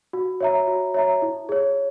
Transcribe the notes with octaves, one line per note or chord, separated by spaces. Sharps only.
F#4
C#5 E5 A#5
F#4
C#5 E5 A#5
E4
G#4 C#5